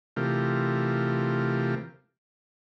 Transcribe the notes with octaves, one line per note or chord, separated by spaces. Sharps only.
C3 E3 A3 F4 G4 A#4